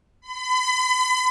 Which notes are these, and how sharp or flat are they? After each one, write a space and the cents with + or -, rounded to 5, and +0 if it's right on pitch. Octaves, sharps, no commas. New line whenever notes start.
B5 +40